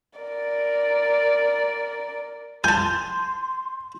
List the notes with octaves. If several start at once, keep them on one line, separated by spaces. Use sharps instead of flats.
A#4 D5
G#5 A5 C6 G6